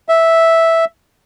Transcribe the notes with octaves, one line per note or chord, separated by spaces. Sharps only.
E5